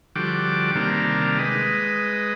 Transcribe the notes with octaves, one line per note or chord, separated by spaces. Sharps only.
D3 F3 G3 F#4 G5 D6
C3 D#3 G3 A#3 D4
G#3 B4 D#5